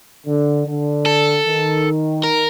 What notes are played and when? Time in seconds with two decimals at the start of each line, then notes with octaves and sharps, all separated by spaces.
0.27 D3
0.67 D3
1.06 A4
1.46 D#3
2.24 A#4